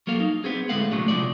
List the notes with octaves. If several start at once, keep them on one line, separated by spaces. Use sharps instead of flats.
F#3 A#3 A4 F5
D#4
B3 C4 G#4
D2 A2 G#3 A3 F5 F#5
A#2 D3 F#3 G#3 A3
C3 F3 G#3 D5